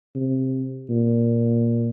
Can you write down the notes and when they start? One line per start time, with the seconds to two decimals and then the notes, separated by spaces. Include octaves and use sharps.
0.15 C3
0.89 A#2